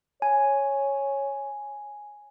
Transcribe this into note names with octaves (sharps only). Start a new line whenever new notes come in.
C#5 G#5